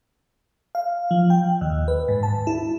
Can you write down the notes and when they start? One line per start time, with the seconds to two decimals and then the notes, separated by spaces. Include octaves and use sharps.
0.75 F5
1.11 F3
1.30 G5
1.61 D#2
1.88 B4
2.08 G#2
2.23 A5
2.47 E4